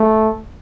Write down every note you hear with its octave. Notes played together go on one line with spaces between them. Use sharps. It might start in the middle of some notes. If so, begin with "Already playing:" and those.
Already playing: A3